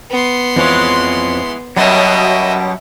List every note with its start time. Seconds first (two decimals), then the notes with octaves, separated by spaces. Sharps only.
0.10 B3 C6
0.56 F2 E3 F3 G#3 C#5
1.77 F#2 B2 F#3 G3 D#5 E5